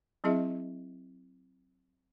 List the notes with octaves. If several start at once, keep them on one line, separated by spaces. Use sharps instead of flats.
F#3 C4 E4 G#4 D#5 E5